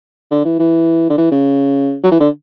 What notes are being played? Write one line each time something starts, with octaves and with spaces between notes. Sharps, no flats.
D3
E3
E3
D3
E3
C#3
F#3
E3
D3